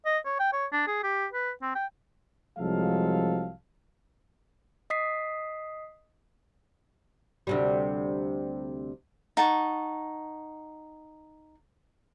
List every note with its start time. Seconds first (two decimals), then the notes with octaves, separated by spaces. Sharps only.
0.06 D#5
0.26 C#5
0.40 G5
0.53 C#5
0.72 D4
0.87 G#4
1.04 G4
1.33 B4
1.62 C4
1.75 G5
2.59 C2 F3 F#3 G#3 A4 F5
4.90 D#5 D#6 B6 C7
7.47 D2 C3 G3
9.37 D#4 F#5 A5 C#6